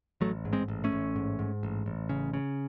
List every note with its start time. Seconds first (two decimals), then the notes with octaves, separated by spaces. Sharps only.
0.21 A1 F#3 A3
0.45 G#2
0.53 G#3 C4
0.68 A1
0.84 A3 C#4
0.92 A1
1.16 G#2
1.39 G#2
1.63 A1
1.86 A1
2.09 C#3
2.34 C#3